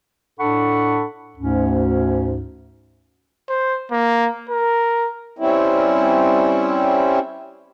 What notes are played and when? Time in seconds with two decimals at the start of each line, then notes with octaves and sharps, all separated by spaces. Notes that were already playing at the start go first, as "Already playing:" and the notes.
0.40 A2 D4 A4 F#5 B5 C#6
1.37 D2 G#2 C#4
3.49 C5
3.92 A#3
4.49 A#4
5.39 G3 C4 C#4 E4